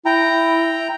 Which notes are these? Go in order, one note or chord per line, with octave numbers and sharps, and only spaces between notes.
E4 G5 A#5